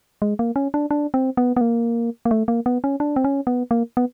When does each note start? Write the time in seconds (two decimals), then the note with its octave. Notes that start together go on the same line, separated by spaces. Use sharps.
0.22 G#3
0.39 A#3
0.56 C#4
0.74 D4
0.91 D4
1.14 C4
1.37 B3
1.57 B3
1.61 A#3
2.25 A#3
2.31 A3
2.48 A#3
2.66 B3
2.84 C#4
3.00 D4
3.16 C4
3.24 C#4
3.47 B3
3.71 A#3
3.97 B3